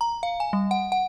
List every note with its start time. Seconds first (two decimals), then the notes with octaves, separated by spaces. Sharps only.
0.01 A#5
0.23 F5
0.40 G#5
0.53 G3
0.71 F#5
0.92 F#5